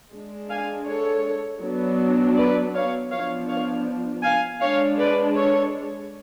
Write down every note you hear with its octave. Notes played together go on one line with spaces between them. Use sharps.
G#3 D4
F5 G#5
A4 C#5
F#3 B3 D4
B4 D5
C#5 F5
F3 B3 D4 C#5 F5
C#5 F5
F5 G#5
G#3 D4 C#5 F5
B4 D5
A4 C#5